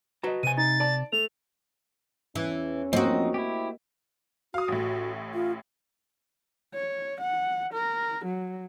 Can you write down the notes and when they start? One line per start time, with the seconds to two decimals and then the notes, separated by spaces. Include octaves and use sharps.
0.23 F#4 B4 D#5 A5 A#5
0.43 C3 G#5 D#7
0.57 D#4 A6
0.80 D5 A5
1.12 A3 F7
2.35 E2 E3 C#4
2.93 F3 A3 A#3 C4 D#4 F#4 D#5
3.34 E4 G4
4.54 F#4 F5 D#6
4.68 A1 A2
5.34 F4
6.74 C#5
7.20 F#5
7.73 A#4
8.25 F#3